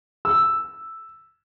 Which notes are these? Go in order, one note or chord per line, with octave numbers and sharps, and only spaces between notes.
E6